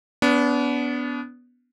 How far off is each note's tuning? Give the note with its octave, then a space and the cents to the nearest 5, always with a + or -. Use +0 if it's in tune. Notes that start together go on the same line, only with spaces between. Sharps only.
B3 +0 D4 -35